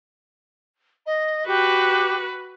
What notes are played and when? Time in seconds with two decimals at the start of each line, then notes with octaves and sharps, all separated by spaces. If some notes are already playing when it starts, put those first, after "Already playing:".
1.06 D#5
1.47 F#4 G4 B4